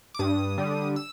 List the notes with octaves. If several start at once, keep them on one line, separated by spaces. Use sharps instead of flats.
D6
G2 D#6
D3 G3
E6